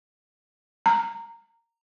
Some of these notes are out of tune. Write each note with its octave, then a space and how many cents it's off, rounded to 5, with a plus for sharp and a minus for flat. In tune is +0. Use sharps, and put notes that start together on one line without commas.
A#5 -10